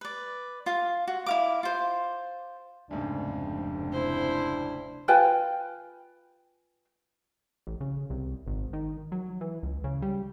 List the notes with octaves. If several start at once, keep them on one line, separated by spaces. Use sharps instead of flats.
B4 D5
F4 F5
F#4
E4 F5 D6
F4 C5
F1 D2 G#2 C#3 C4 D4
E4 C5
F4 B4 G5 G#5
A1
C#3
C2
G#1
D#3
F#3
E3
C#2
C#3
G3